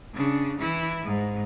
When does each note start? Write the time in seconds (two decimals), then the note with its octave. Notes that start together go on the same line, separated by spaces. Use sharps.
0.14 C#3 D4
0.59 E3 E4
1.04 G#2